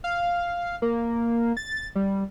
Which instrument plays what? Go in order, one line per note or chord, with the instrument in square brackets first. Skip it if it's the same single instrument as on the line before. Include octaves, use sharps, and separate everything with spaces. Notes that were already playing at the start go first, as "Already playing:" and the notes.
[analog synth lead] F5
A#3
A6
G3